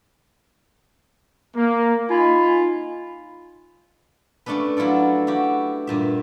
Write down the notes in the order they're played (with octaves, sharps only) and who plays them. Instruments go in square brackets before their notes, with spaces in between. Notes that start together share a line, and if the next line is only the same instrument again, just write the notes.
[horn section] A#3
[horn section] D#4 G#5 B5 [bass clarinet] F4
[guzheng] A3 C#4 D4 A4 B4
F#3 E4 F4 A4 D5
E4 F#4 G4
G2 A#2 E5